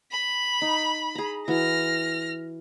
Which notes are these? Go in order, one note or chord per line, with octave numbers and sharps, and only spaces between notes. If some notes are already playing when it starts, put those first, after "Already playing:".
B5
D#4
G#4 A#5
E3 F#4 F6 A#6